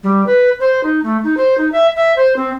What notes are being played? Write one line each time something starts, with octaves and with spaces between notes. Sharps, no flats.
G3
B4
C5
D#4
A3
D#4
C5
D#4
E5
E5
C5
C4